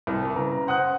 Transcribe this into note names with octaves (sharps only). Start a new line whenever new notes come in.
C2
C#3 B4 A#5
C5 F#5 D#6 F#6